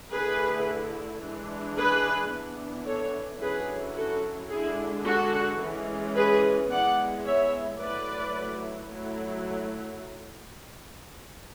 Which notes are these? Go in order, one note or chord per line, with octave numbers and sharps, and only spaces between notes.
D3 A3 E4 G#4 B4
E3 G#3 D4
G#4 B4
E3 B3 D4
A4 C#5
D3 F#3 C#4 E4 G#4 B4
F#4 A4
D3 G#3 D4 E4 G#4
F#4 A4
E3 G#3 C#4
G#4 B4
G#3 B3 E4 D5 F#5
C#5 E5
F#3 A3 E4 B4 D5
F#3 A3 E4